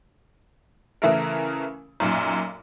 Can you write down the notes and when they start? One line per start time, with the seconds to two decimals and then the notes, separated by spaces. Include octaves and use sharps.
1.02 C#3 E3 A3 A#4
2.00 B1 F#2 A#2